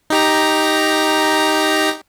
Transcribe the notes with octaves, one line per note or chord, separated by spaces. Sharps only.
D#4 G4 A#5